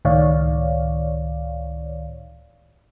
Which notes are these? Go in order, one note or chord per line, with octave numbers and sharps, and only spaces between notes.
C#2 A2 D#3 C#5 D5 F5